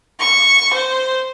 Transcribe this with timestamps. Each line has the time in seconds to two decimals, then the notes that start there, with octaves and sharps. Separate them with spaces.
0.20 C#6
0.74 C5